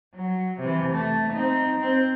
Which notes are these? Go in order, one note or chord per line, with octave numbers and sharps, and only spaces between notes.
F#3
C3 E3
A3
C4 D#4
C4